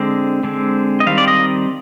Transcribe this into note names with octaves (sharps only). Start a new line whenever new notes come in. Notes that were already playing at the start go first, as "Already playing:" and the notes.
Already playing: D3 G#3 C4
D3 G#3 C4
D#5
D#3 G3 C4 F5
D5
D#5